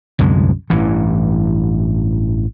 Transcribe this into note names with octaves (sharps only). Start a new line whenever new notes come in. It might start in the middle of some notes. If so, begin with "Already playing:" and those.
C2 F#2 D3 G#3
A1 G2 E3